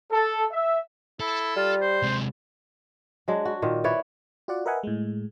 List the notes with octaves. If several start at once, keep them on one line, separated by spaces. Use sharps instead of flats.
A4
E5
E4 A4
G3 F4
C5
C3 G#3
F#3 G#3 D4
F#4
A#2 D#3
E4 B4 C#5 D5
F4 F#4 D5 F#5
A#4 B4 D#5 E5 F#5 G#5
A2 G#3